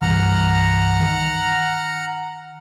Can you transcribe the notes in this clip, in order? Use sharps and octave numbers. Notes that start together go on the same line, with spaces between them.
C2 G2 E3 F#5 A#5 F6
D#3